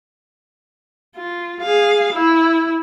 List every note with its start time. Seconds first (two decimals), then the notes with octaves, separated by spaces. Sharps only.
1.16 F4
1.62 G#4 F5
2.13 E4